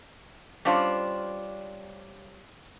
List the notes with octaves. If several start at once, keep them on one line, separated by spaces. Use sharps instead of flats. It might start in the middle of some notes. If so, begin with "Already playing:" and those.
G3 C#4 D4 F4 C5